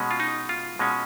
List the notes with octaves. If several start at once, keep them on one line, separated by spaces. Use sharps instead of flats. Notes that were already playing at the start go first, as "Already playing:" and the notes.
Already playing: B2 G#3 C#4
F4
D#4
F4
B2 G#3 C#4